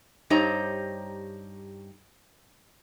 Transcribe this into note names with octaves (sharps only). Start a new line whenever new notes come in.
G2 D#4 G4 C5 C#5 A#5